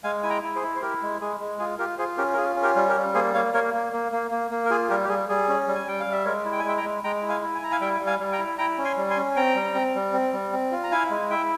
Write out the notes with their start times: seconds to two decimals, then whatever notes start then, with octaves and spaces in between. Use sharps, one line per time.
0.04 G#3 F5 G#5
0.23 E4 G#5
0.30 G5 A#5
0.43 E4
0.55 G#4 C5
0.63 E4
0.76 C5
0.82 E4 G4 A#4
1.02 G#3
1.21 G#3 G#4
1.40 G#3
1.59 F4 G#4
1.78 F4 G4 A#4
1.99 F4 G#4 C5
2.17 C#4 G4 A#4
2.33 A#4
2.37 F4 G#4
2.56 C#4
2.63 G4 A#4
2.76 G3
2.89 G4 A#4
2.96 G3
3.14 A#3 G#4 C5
3.34 A#3 C#5 F5
3.54 A#3 A#4 C#5
3.74 A#3
3.93 A#3
4.12 A#3
4.31 A#3
4.51 A#3
4.65 A#4
4.70 F4 G#4
4.89 G3 G4 A#4
5.04 G4
5.09 G3 G#4
5.29 G3 G#4
5.49 C#4
5.68 G3
5.75 G#5
5.87 G3 G5
6.00 F5
6.07 G3
6.12 E5
6.25 G#3 A#4 C#5
6.45 E4
6.52 G5
6.59 G#5
6.64 G#3 E5 G5
6.77 G5 A#5
6.83 G#3
7.04 G#3 G5 A#5
7.22 E4
7.29 F5 G#5
7.42 E4
7.55 G#5
7.62 E4 A#5
7.72 F5 G#5
7.81 G3 E5 G5
8.00 G3
8.06 F5 G#5
8.20 G3
8.32 G5 A#5
8.39 E4
8.58 E4 G5 A#5
8.78 C#4
8.84 G#5 C6
8.97 G3
9.10 G#5 C6
9.17 C#4
9.36 C4 G5 A#5
9.55 G3
9.75 C4
9.95 G3
10.13 C4
10.33 G3
10.52 C4
10.72 F4
10.84 A#5
10.92 E4 F5 G#5
11.10 G#3
11.30 E4 E5 G5